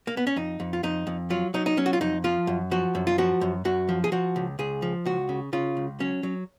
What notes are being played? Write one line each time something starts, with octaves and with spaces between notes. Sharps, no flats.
A#3
B3
C#4
F2 D#4
F2
F4
F2 D#4
F2
F#3 F4
F#3 D#4
D#4
F#3 C#4
F#4
F4
F2 D#4
F3 F4
F#2
F3 F#4
F#2
F4
F3 F#4
F#2
F#2 F#4
F3
G#4
F3 F#4
C#2
C#2 G#4
F3
C#2 F#4
C#3
C#3 F4
C#2
F#3 C#4
F#3